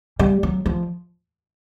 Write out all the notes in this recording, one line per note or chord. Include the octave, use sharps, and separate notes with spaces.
G3
F#3
F3